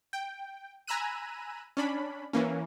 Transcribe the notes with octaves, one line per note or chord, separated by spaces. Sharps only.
G5
G#5 A#5 B5 E6 F#6 D#7
C#4 D4 B5
E3 A#3 C#4